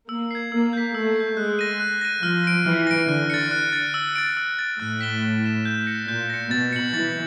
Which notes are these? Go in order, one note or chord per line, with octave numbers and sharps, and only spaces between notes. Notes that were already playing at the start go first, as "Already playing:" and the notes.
A#3 E6
G#6 C7
A#3 E6
G6 B6
A3 E6
G6 B6
G#3 F#6
A#6 D#7
F#6
A#6 D#7
F3 F6
A#6 D7
E3 F6
A#6 D7
D3 F#6
A6 C#7
F#6
A6 C#7
E6
A6 D7
E6
A6 D7
A2 F#6
B6 E7 G7
F#6
B6 E7 G7
G6
A#6 C#7
A#2 G6
A#6 C#7
B2 A6
C#7 F#7
E3 A6